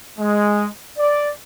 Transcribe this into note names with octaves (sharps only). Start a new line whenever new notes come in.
G#3
D5